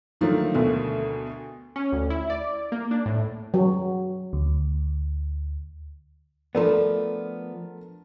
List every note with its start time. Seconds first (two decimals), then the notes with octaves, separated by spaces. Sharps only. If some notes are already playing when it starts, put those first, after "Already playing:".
0.21 D3 D#3 F3 F#3 A3 A#3
0.54 D2 B2 A3 A#4
1.76 C#4
1.92 D2
2.10 E4
2.30 D5
2.72 A#3
2.91 D4
3.06 A2
3.54 F#3
4.33 D2
6.55 F3 A3 B3 D4 A4 A#4